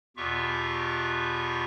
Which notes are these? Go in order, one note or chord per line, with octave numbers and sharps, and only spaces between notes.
E2 B2 F4 G4 E5 C#6